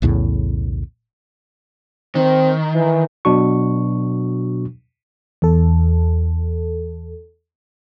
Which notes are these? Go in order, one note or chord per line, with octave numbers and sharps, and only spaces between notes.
B1 E2 A2 C#3
D#3 C4
E3
B2 F#3 D4 F#4 C#6
E2 A4